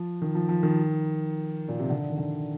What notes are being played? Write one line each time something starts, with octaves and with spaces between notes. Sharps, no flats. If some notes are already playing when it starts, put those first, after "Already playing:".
Already playing: F3
D#3
F3
F3
D#3
A#2
C3
D3
D#3
D3